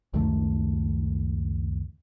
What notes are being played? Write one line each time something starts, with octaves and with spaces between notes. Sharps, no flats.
C#2 F#2 D#3 A3